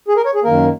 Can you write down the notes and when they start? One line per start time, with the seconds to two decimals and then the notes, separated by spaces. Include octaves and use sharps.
0.08 G#4
0.17 A#4
0.26 C#5
0.35 G#4
0.44 F#2 D#3 A#3 A#4